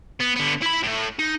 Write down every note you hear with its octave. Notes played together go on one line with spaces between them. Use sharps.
B3
D3 B3
E4 B5
A2 A3
D#4